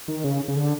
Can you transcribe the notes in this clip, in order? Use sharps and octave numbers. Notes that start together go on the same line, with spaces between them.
D#3
C#3
C#3
D3